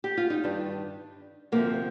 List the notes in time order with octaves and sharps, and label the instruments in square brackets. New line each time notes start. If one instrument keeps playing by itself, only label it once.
[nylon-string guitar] G4
F4
D#4
G2 D#3 G3 D4
D2 C3 F3 A#3